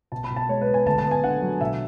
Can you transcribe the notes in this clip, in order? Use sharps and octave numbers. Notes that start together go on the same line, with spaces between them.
B2 A5
B5
B2
A5
G#3 C#5
B4
B3
G#5
D2 A5
A5
B3
G#5
D3 F#5
F#3
B2 E5